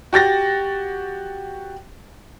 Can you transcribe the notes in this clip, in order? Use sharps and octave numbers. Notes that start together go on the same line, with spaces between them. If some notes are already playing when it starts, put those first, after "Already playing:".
F#4 G4 A6 A#6